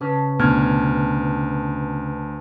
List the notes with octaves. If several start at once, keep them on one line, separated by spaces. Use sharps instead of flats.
C#3 B4 A5
D2 B2 F6 G#6